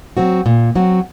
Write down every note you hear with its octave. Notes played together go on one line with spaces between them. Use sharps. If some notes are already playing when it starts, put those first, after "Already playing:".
F#3 C4 F#4
A#2
F#3 C4 F#4